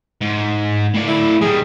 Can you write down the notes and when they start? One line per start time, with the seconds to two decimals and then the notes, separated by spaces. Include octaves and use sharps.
0.21 G#2
0.94 A2 D5
1.08 E4
1.41 D#3 G3 G#4